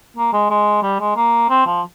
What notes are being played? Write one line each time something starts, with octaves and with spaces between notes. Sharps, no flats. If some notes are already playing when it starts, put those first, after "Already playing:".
A#3
G#3
G#3
G3
G#3
A#3
C4
F3